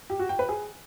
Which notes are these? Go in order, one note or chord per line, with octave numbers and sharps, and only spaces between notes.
G4
F#4
G5
B4
G#4